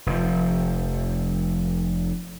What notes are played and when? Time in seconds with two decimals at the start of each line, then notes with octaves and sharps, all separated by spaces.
0.06 F1 F3